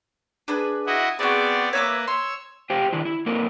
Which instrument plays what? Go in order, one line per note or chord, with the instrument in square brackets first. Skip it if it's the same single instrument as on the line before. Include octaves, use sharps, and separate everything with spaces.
[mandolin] D4 G#4 B4
[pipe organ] E4 F#4 D#5
[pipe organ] B3 C4 D5 [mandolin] F#4 G#4
[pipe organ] A#3 B4 [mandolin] C#5 E5 D6
[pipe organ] C#5 E6 [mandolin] C6
[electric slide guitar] G4 C5 F5 G5
D#3 D4 E4
E4
A#3 C4 D4 D#4 A#4